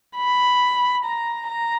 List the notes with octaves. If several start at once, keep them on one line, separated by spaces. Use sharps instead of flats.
B5
A#5
A#5